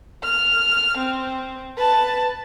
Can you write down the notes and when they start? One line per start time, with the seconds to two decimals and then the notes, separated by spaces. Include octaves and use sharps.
0.23 F6
0.98 C4
1.78 B4 A5